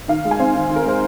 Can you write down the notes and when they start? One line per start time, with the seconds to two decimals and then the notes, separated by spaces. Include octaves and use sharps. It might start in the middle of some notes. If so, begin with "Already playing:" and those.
0.08 D#3 F5
0.25 G#3
0.31 G#5
0.40 C4 F5
0.55 D#3
0.70 D#3
0.76 A#4
0.86 G#3 C5